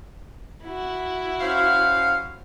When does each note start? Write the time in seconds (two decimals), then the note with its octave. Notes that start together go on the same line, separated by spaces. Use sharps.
0.65 E4 F#4
1.41 C#4 C5 F5